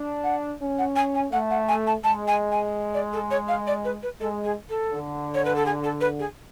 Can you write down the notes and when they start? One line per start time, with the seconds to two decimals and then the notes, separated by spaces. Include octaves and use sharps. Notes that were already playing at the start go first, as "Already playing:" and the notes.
Already playing: D4
0.24 F#5
0.60 C#4
0.79 F#5
0.96 G#5
1.15 G#5
1.32 A3 F#5
1.51 F#5
1.68 G#5
1.87 A5
2.04 G#3 A5
2.28 G#5
2.52 G#5
2.94 D5
3.13 A4
3.31 C#5
3.48 F5
3.67 D5
3.85 B4
4.03 B4
4.21 G#3 A4
4.44 G#4
4.70 A4
4.93 D3
5.34 C#5
5.45 B4
5.56 A4
5.66 G#4
5.84 A4
6.01 B4
6.19 G#4